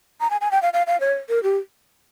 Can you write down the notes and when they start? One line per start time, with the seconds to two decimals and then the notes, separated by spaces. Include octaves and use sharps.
0.21 A#5
0.30 G#5
0.41 G#5
0.52 G5
0.62 F5
0.73 F5
0.87 F5
1.00 C#5
1.29 A#4
1.43 G4